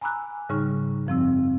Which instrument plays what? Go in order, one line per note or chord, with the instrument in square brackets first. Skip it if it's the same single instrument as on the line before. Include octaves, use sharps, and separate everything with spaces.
[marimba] G#5 A#5 B5 D6 E6 F#6
G#2 C#3 G3 D#4 C#6 F6
F#2 F3 C4 E6